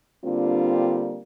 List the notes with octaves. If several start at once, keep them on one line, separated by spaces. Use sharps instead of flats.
D3 G3 A#3 C4 D4 F4